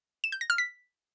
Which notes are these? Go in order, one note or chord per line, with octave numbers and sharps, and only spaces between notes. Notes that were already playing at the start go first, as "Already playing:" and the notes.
E7
G6
A#6
F6
B6